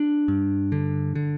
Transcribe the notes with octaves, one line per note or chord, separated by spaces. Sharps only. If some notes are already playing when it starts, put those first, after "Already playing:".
Already playing: D4
G2
D3
D3